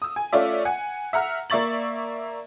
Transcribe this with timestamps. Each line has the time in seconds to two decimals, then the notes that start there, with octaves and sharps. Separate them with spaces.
0.02 D#6 E6
0.16 G#5
0.33 A3 C#4 F4 D5 E5
0.65 F#5 G#5
1.13 E5 F#5 A#5 F6
1.50 A#3 D5 E5 C#6 A6 F#7